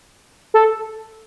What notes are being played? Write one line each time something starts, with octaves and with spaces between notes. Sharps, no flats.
A4